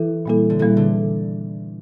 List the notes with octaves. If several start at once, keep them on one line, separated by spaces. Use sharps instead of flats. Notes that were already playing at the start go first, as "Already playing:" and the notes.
Already playing: E3 E4 A4
A#2 G3 A#3 E4 A4
D3
A#2 E3 G3 A#3 E4 A4
D3